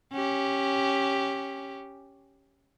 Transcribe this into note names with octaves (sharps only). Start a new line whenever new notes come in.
C#4 G4